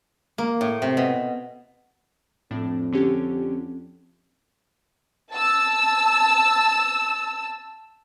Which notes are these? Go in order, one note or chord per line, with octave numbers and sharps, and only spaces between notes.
A#3
A2
C3
B2
F2 A2 D4
D3 C#4 G4
A5 E6